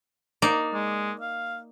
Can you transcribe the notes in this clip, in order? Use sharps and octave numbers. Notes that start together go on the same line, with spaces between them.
A#3 D#4 D5
G#3
F5